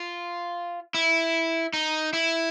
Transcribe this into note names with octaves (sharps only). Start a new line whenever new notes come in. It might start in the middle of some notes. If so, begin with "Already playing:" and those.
Already playing: F4
E4
D#4
E4